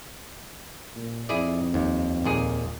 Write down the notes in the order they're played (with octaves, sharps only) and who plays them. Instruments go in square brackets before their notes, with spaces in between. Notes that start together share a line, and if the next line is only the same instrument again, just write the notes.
[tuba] A#2
[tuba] F2 [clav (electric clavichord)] E4 G#4 D5
[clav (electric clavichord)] D#2
D#2 A#2 G#4